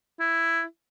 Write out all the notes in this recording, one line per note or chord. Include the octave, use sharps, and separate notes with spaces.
E4